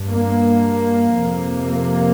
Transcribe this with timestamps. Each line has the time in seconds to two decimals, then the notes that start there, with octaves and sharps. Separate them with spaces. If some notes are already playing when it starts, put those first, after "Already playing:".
Already playing: G2
0.09 A#3
1.14 F2 C3
1.67 A#3